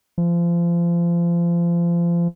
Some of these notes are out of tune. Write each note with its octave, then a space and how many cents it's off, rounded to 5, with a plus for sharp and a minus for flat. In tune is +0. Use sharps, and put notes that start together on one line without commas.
F3 -30